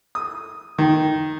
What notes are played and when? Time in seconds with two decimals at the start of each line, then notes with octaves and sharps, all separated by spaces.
0.15 D#6
0.78 D#3